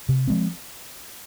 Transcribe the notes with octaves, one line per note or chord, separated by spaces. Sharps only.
C3
F3 G#3 C4